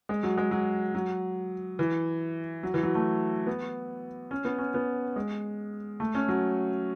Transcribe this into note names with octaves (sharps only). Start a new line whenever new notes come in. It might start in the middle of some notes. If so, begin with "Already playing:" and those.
G#3
F#3
G#3
F#3
F#3
E3
F#3
E3
F#3
A3
B3
C#4
B3
C#4
B3
G#3
A3
C#4
F#3